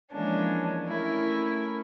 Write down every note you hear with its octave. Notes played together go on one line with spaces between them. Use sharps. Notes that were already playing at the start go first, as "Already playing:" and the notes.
E3 F3 G#3 A#3 C#4 D4
A3 C#4 E4 A#4